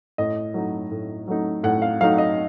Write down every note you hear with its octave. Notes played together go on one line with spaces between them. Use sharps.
A2 D#5
F#3 A3 D#4
A2
F#3 A3 D#4
A2 F#5
F5
F#3 A3 D#4 F5
D#5